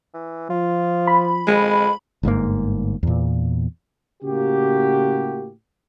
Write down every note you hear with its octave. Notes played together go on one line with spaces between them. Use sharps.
E3
F3 F4
B5
F2 G#3
G1 G#2 C#3 A#3
E2 A#2
A2 C#3 A#3 F#4 G4